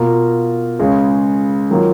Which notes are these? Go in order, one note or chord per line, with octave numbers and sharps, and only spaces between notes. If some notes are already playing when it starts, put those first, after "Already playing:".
Already playing: B2 A#3 F4 A#4
C#2 C#3 G#3 C#4
D#3 F#3 A#3 F4